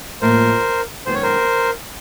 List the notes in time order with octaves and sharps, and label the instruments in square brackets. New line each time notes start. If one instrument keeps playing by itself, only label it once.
[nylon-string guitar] A2 F3 A#3 [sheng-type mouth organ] A#4 C5
[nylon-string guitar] F#2 D#3 G#3 B3 [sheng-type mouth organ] C5
[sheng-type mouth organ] C#5
A#4 C5